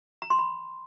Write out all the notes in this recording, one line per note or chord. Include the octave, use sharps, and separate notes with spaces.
A#5
C6
B5